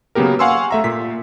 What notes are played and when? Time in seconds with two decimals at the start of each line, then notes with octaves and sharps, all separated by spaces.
0.15 C#3 F#3 A#3 B3 G4 A#4
0.39 F5 F#5 G#5 C6 C#6 E6
0.71 A3 E5 A#5
0.84 A#2 B6